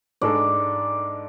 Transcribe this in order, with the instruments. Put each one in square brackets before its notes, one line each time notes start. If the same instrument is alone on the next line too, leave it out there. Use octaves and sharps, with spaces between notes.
[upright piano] G#2 G#3 D4 A4 [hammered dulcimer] D5